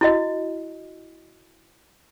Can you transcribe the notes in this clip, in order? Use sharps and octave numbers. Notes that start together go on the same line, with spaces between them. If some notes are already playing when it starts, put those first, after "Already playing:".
E4 F#4 D#5